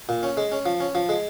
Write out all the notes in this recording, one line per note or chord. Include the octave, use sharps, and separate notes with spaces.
A#2
C#4
G#3
C#4
F3
C#4
F3
G#3